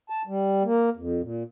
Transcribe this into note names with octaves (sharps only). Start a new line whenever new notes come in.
A5
G3
A#3
F2
A#2